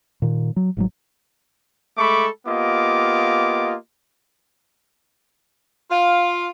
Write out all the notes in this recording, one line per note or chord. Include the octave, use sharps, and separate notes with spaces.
A#2 D#3
F#3
G1 G#2 F#3
G#3 A3 A4 B5 C#6 D6
A#3 B3 F4 G4 D#5 D6
F4 F5